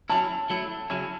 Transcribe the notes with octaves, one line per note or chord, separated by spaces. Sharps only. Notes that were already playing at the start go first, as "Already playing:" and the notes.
F#3 C#4 E4 A5
F#3 A3 E4
C#3 F#3 C#4 E4